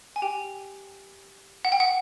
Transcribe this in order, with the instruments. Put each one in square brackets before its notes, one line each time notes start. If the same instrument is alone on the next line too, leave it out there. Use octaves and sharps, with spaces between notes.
[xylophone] G#5
G4 G5
F#5
G5
F#5